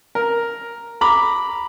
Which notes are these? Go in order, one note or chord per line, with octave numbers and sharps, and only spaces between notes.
A#4
A#5 B5 D6